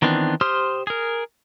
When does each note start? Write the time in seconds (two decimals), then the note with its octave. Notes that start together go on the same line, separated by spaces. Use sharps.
0.02 D#3 E3 B3 C4 D4
0.41 G4 C5 C6 D#6 F6
0.87 G#4 A#4